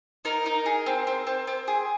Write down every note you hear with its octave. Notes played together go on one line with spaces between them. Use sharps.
D#4 A#4
D#4
G#4
C4
C4
C4
C4
G#4